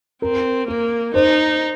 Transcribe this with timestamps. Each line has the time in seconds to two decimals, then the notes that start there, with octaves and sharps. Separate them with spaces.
0.22 C4 A#4
0.67 A#3 A#4
1.14 D#4 C5